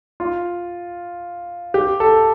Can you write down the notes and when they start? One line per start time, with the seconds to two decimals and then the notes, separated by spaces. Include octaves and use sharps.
0.20 F4
1.74 G4
2.00 A4